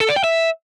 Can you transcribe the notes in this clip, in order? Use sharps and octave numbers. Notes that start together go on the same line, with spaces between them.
A4
D5
G5
E5